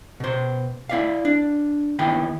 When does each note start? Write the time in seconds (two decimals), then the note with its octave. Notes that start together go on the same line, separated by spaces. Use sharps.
0.20 B2 C5
0.89 E4 D5 F5
1.25 D4
1.99 D#2 D#3 B3 E4 G5 B5